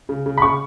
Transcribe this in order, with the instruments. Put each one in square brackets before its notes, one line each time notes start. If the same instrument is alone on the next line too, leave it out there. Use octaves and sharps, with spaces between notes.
[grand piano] C#3
C#3
[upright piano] B5
[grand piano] C#3 [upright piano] C#6